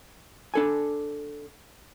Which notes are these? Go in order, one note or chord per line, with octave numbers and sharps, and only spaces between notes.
D4 A4 G#5